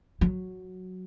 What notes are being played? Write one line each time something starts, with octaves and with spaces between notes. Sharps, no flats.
F#3